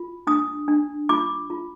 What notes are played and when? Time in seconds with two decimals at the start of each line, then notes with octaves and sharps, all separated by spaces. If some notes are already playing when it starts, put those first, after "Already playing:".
Already playing: F4
0.27 D4 D#6
0.68 D4
1.09 F4 D6
1.50 F4